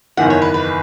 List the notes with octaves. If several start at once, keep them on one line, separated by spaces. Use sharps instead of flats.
F#1 E2 D#3 F#5
C#5
B4
B4